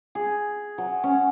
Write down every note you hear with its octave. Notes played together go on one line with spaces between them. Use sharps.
G#4
F#3
C#4